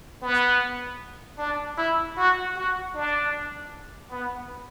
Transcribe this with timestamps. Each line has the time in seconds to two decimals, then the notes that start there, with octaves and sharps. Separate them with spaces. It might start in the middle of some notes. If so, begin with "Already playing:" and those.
0.23 B3
1.39 D4
1.78 E4
2.17 F#4
2.57 F#4
2.94 D4
4.12 B3